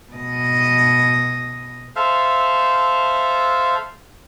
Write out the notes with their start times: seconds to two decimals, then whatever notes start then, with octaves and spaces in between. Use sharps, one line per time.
0.13 B2 D#5
1.96 A4 C5 E5 F5